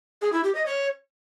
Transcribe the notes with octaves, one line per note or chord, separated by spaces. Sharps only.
G#4
E4
G4
D#5
C#5